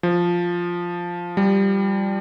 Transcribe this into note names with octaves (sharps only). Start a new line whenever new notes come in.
F3
G3